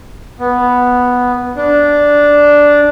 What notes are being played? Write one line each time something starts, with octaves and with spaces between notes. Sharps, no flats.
B3
D4